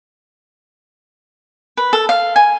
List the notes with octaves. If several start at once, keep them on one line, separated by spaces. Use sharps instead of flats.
B4
A4
F5
G#5